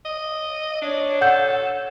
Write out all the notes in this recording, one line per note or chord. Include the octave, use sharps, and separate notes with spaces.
D#5
D4 C#5
A4 F#5 G6